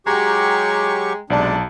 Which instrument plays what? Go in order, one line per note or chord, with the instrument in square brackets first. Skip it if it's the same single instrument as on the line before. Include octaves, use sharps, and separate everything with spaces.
[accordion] F#3 G4 C#6 [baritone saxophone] G#3 [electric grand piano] G5 A#5
[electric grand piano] B1 D5 A5 [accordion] C3 G#3 D4